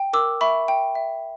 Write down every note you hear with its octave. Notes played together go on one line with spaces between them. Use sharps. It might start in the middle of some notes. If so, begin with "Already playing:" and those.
Already playing: G5
A#4 D6 E6
E5 B5 C#6
G5
E5